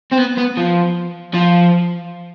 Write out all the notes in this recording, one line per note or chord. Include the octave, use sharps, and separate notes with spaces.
C4
B3
B3
F3
F3